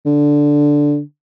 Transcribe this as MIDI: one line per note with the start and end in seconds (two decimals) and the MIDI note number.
0.06 1.00 50